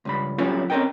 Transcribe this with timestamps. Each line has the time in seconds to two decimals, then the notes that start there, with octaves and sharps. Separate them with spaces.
0.05 C#2 G2 B5
0.38 F#3 G3 C#4 E4 F4
0.70 C4 C#4 F#4 A#4 D#5 G5